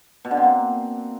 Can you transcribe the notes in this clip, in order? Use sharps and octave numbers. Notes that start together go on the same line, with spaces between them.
B2
D3
C4
A#3